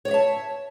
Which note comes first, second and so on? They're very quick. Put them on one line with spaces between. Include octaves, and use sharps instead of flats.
C#5 D5 E5 A5